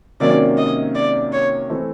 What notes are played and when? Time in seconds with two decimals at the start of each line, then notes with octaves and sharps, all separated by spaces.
0.20 C3 D#3 F#3 A#3 C#4 D5
0.58 D#5
0.95 D5
1.33 C#5
1.69 E3 A3 C4